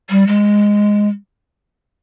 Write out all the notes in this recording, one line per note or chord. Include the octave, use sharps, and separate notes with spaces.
G3
G#3